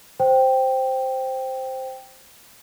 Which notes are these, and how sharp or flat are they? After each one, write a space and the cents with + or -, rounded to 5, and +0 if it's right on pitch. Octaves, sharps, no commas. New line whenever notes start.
C5 +0 G5 +0